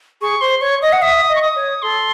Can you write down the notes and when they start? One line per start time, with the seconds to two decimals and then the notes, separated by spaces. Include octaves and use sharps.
0.21 G#4 C#6
0.41 C5 C6
0.61 C#5 C#6
0.82 D#5 D#6
0.92 F#5
1.02 E5 D#6
1.29 D#5
1.36 C#6
1.42 D#6
1.56 C#5
1.82 A4 C6